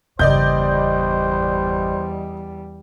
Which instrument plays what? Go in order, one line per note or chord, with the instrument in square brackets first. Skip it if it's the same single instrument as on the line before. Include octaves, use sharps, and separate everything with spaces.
[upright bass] G1 C#3 [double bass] E2 G3 [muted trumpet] C5 [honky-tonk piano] D5 D#5 G6